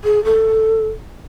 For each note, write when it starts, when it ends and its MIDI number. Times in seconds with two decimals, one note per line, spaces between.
0.04 0.23 68
0.25 0.88 69